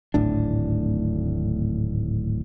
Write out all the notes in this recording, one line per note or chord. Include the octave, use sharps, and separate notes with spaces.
D1 G#1 A2 D4